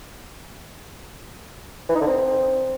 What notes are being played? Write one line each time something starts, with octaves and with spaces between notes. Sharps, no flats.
E3
D#4
D3
C4